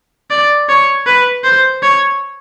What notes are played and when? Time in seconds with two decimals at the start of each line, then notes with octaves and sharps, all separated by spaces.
0.31 D5
0.69 C#5
1.07 B4
1.44 C5
1.83 C#5